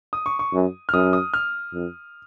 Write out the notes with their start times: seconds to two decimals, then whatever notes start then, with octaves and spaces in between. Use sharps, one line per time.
0.13 D#6
0.26 C#6
0.39 C#6
0.53 F#2
0.89 F6
0.93 F#2 D#6
1.13 D#6
1.34 F6
1.73 F2